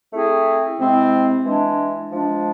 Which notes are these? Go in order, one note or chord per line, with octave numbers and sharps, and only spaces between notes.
A3 C4 E4 G#4
C3 G#3 C4 E4
E3 G#3 D4
F3 G#3 D4